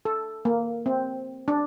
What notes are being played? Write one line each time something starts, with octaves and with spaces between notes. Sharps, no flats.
A4
A#3
C4
D4